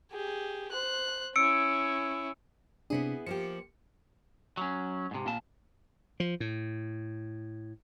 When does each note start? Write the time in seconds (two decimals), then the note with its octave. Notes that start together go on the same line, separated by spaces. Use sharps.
0.11 G4 G#4
0.71 C5 F#6
1.36 C#4 E4 E6 C#7 D7
2.90 C3 B3 D4 E4 G#4
3.26 F3 A#3 G4 C#7
4.57 F#3 C#4
5.11 G#2 C3
5.26 A#2 A5
6.20 F3
6.40 A2